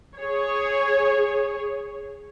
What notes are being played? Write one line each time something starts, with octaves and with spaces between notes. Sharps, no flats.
G#4 C#5